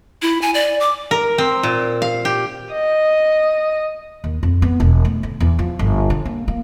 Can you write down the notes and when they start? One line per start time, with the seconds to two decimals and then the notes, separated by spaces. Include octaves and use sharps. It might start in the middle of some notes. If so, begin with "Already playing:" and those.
0.22 E4
0.42 G#5
0.54 D5
0.80 D6
1.11 A#4
1.38 C4
1.63 A#2
2.02 F5
2.25 G4
2.73 D#5
4.24 D#2
4.43 F2
4.62 B3
4.80 E1
5.05 A3
5.23 D3
5.40 E2
5.59 F3
5.79 G1
6.10 D3
6.25 A#3
6.48 A#3